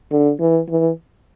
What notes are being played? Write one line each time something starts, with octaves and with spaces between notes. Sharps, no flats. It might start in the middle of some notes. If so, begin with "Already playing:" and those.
D3
E3
E3